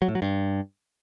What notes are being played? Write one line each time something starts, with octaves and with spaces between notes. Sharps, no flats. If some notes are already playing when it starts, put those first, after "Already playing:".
F#3
A2
F#3
G2